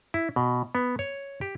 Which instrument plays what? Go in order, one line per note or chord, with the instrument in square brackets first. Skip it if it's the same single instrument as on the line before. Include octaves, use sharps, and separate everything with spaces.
[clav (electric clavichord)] E4
B2
B3
C#5
G4